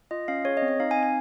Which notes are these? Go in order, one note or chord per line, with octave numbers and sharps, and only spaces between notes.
F4 D#5
C#4 F5
G#4 C#5
D#5
C4
D#5
D#4 F5
G#5
C4
G#5